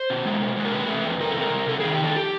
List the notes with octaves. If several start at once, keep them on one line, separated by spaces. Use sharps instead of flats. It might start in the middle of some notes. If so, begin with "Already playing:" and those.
Already playing: C5
B2
G#3
B2
G#3
A#4
C3 B4
A3
F2
C3 A#4
A4
C3 A#4
C3
C3 A4
D#3 G#4
G4
F2 A4
G4